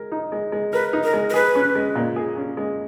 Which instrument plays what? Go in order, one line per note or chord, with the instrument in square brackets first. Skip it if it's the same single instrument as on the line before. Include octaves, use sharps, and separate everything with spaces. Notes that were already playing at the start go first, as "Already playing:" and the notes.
Already playing: [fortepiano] G#3 A#4
D#4
G#3
G#3
[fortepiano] A#4 [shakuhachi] B4
[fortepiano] D#4
[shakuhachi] A#4
[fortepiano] G#3
[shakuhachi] A#4
[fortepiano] G#4 [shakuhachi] B4
[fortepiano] C#4
G#3
A#2
G#4
C#4
G#3